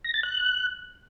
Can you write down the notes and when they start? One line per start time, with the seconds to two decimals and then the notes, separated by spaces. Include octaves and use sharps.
0.04 A#6
0.14 A6
0.23 F#6